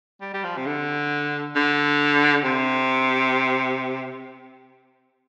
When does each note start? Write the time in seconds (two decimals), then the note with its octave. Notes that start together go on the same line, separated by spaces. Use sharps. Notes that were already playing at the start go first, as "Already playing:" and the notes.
0.21 G3
0.34 G3
0.44 F3
0.57 C3
0.66 D3
1.56 D3
2.44 C3